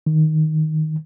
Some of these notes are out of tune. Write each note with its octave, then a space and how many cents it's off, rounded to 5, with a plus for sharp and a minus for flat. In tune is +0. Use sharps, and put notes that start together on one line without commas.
D#3 +5